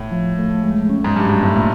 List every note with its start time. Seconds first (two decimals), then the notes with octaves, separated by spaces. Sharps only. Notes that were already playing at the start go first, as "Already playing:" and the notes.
Already playing: A2
0.12 F3
0.38 A3
0.63 G#3
0.90 C#4
1.04 G#2
1.16 G2 F#3
1.29 G#2
1.43 A2 A3
1.56 A#2